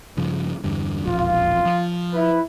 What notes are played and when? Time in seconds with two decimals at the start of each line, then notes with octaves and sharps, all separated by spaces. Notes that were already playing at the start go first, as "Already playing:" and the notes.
0.17 G2 C#3 F3
0.64 E2 G2 D3
1.06 E1 A#1 F2 F4
1.66 F3
2.13 E4 B4